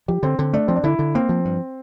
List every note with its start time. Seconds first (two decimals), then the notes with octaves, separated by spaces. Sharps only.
0.08 F3 G4
0.23 D3 C4
0.39 D3 C4
0.53 A3 D4
0.68 F3 C4
0.76 D4
0.84 D3 E4
0.99 D3
1.15 A#3 C4
1.29 F3
1.45 G2